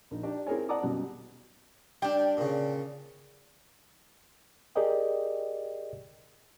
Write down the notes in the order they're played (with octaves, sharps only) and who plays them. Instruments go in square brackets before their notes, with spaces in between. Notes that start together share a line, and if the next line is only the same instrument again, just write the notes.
[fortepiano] A#1 D#4
D4 D#4 G4 D5
C4 E4 G#4 A#4 C#5 G#5
D5 F#5 A5 A#5 D6 D#6
F#2 B2 G3
[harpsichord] G3 [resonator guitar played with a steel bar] D4 G5
[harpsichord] A#2 C#3
[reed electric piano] G4 G#4 A#4 D5 D#5 G5